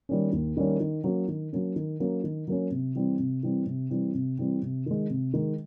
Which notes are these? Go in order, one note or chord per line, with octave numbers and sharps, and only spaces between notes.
D#3 G3 A#3 C#4
D#2
D#3 G3 A#3 C#4
D#3
F#3 A#3 C#4
D#3
F#3 A#3 C#4
D#3
F#3 A#3 C#4
D#3
F#3 A#3 C#4
C3
E3 G3 C4
C3
E3 G3 C4
C3
E3 G3 C4
C3
E3 G3 C4
C3
D#3 G#3
C3
D#3 G#3